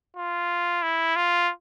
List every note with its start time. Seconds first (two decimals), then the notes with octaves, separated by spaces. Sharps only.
0.17 F4
0.83 E4
1.16 F4